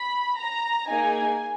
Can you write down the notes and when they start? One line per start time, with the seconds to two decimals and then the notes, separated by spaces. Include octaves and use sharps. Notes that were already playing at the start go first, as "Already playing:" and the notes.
Already playing: B5
0.37 A#5
0.88 A#3 D#4 G#4 G#5